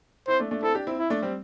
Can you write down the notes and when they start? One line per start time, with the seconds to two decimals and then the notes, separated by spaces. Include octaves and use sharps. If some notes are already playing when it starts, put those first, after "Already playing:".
0.28 C4 E4 C5
0.39 A3 D4
0.51 A3 D4
0.63 C4 E4 A4
0.75 D4 G4
0.87 C4 E4
0.99 E4
1.10 A3 D4
1.22 G3 C4